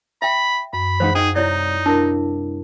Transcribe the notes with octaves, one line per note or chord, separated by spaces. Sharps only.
E5 G5 B5
F#2 B5
E3 G#3 D#4 C5 F5 F#5
D#4 G#4 D#5 G5
C2 D#4 E4 C#5 D5
C2 D4 E4 A#4 A5